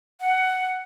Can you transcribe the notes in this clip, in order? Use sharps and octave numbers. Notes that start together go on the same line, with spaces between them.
F#5